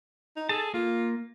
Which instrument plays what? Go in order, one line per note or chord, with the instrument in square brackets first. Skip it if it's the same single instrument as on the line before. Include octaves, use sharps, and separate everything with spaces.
[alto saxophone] D#4
[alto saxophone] G#4 [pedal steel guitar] A4 A5
[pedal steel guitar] A#3 [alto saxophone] F4